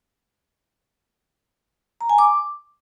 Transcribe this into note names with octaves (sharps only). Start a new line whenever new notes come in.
A#5
G#5
D6